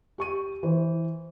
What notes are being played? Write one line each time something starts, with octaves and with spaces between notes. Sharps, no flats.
G4 C#6 D#7
E3 C5